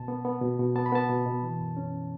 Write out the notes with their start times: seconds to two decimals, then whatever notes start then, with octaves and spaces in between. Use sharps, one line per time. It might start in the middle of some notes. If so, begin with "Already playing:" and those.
Already playing: B2 A5
0.08 B3
0.25 B3
0.42 B2
0.59 B2
0.76 B3 A5
0.86 B5
0.92 B3 A5
1.09 B2
1.26 B2
1.43 E3
1.60 F#2
1.77 C#4